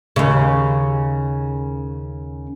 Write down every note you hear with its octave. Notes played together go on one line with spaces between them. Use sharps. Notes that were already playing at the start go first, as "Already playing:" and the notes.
D#2 C#3